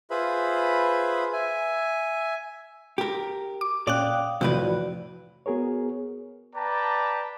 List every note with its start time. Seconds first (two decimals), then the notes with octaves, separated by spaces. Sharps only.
0.10 F4 G#4 B4 C5 E5 B5
1.33 E5 G#5
2.98 G4 A#4
3.61 D6
3.87 A#2 C#4 D5 F5 G5 D#6 F#6
4.41 F2 A2 C3 E3 F#4 B4 D5
5.46 B3 F#4 G#4 A#4 C#5
6.55 B4 D5 G5 A5 A#5